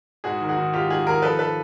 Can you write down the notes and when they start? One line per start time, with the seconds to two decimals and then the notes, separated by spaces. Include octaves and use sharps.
0.24 G#2 F#4 G#4
0.41 D#3
0.49 F#4 G#4
0.57 D#3
0.73 G#2 F4 G4
0.90 G#2 F#4 G#4
1.06 D#3 G#4 A#4
1.22 F3 A4 B4
1.39 A4 B4